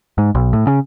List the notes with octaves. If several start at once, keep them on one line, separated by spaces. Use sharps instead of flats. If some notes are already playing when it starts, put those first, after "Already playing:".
G#2
B1
A2
C#3